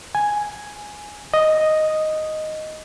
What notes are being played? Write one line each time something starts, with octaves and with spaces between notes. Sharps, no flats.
G#5
D#5